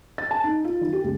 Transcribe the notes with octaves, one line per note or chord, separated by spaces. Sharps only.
A6
A5
D#4
F4
D#3
G4
C#2